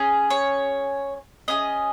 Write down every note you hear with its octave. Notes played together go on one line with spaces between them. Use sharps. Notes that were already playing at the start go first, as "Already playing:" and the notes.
Already playing: C#4 G#4
C#5
C#4 F4 G#4 D#5